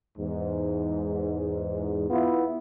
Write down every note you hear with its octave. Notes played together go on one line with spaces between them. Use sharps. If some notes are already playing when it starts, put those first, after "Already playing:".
E2 G#2
B3 E4 F4